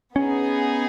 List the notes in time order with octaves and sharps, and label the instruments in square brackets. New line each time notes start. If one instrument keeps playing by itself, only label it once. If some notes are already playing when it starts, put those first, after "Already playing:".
[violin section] B3 D#4 G#4 [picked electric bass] C#4